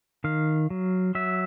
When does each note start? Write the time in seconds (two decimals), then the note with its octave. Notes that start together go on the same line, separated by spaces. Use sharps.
0.24 D#3 F5
0.70 F#3
1.15 F#3 E5